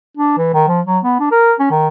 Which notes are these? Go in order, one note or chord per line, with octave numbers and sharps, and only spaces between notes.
D4
E3
D#3
F3
F#3
B3
D4
A#4
C#4
D#3